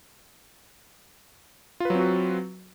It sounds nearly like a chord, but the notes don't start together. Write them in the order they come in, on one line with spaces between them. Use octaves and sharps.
F4 B4 F#3 C4 F#4